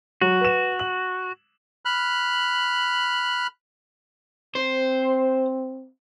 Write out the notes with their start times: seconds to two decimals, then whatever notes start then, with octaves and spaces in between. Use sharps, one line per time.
0.21 F#3 F#4
0.41 B4 E7
0.79 F#7
1.85 B5 F6 F#6
4.55 C4 C5